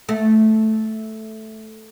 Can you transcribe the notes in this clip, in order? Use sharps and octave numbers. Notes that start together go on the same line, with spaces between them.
A3